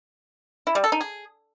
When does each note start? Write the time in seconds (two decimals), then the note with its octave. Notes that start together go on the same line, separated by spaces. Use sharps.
0.67 E4
0.75 G3
0.84 A4
0.92 D#4
1.01 G#4